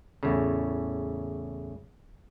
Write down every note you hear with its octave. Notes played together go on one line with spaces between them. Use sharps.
E2 A2 C#3